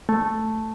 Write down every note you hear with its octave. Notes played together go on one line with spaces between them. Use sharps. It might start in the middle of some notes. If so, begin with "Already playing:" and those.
A3